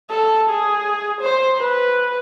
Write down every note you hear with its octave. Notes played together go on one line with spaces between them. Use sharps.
A4
G#4
C5
B4